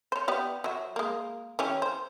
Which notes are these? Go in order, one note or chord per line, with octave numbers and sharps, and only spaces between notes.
C5 C#5
B3 G4 D5
F#3 E5
G#3 A#3
E3 C#4 G4
C5